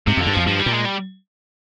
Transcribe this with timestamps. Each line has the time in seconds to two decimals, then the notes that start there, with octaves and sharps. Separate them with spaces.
0.07 G#2 C3
0.17 F2 D3
0.27 G2
0.33 F2 F3
0.46 G2 F3
0.59 G3
0.66 A#2
0.72 G#3
0.85 G3